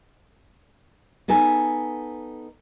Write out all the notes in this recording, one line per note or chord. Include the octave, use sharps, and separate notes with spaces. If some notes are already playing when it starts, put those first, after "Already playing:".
B3 D#4 A4 G#5